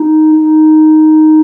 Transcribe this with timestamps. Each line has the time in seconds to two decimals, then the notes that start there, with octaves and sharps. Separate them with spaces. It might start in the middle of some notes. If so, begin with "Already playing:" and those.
Already playing: D#4
0.35 D#4